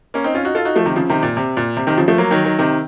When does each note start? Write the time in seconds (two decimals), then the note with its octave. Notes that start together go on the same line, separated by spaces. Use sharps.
0.14 A#3 C#4
0.24 C4 D#4
0.34 C#4 F4
0.45 D#4 F#4
0.55 F4 A4
0.65 D#4 F#4
0.76 F3 A3
0.86 C3 D#3
0.96 C#3 F3
1.09 C3 D#3
1.23 A#2
1.37 C3
1.57 A#2
1.77 C3
1.87 C3 D#3
1.98 C#3 F3
2.08 F3 A3
2.18 F#3 A#3
2.31 D#3 F#3
2.44 D#3 F#3
2.59 C3 D#3